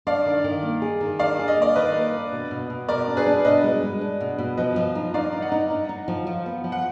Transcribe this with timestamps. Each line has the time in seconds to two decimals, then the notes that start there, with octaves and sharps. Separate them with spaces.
0.07 D4 D5 F5
0.26 D#3
0.44 D#3
0.63 A#3
0.82 G#4
1.01 D#3
1.19 D4 D5 F5
1.39 G#4
1.48 D#5
1.57 A#3 D5
1.76 D#3 B4 D#5
1.95 A#3
2.13 D4
2.32 B2
2.51 B2
2.70 B2
2.88 B2 A#4 D5
3.08 D4
3.17 G#4 B4
3.26 D4
3.45 B2 B4 D#5
3.63 G#3
3.83 G#3
4.01 D4
4.21 B2
4.38 B2
4.57 F3 B4 D#5
4.76 F3
4.95 D#4
5.14 D#4 D5 F5
5.32 D#4
5.42 D#5 F#5
5.52 D#4
5.70 D#4
5.89 D#4
6.08 F3
6.27 F3
6.46 B3
6.64 F3
6.72 F#5